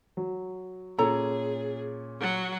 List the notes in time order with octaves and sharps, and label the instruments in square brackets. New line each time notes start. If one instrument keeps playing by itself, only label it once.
[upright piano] F#3
[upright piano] A#2 C#4 [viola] G#4 [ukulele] A4 C#5 A#5
[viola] F#3 F#4